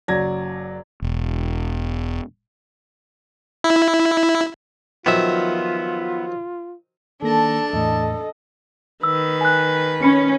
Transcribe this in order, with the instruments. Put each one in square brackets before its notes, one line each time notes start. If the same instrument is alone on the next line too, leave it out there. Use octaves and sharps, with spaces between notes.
[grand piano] F#1 F#3 D5 G#6 A#6
[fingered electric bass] E1
[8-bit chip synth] E4
[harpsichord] D#3 F3 F#3 [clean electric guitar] B3 E5 [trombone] F4
[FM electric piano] D#3 A#3 A#6 [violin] D4 A5 [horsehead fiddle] A4
[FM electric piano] E2 A2 [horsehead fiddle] A4 D#5
[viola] D#3 B4 [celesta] E6
[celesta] G#5 F#6
[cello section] C#4 [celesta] B5 C#7